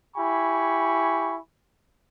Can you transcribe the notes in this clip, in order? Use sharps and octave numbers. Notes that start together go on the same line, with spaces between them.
E4 G4 G#5 B5 C#6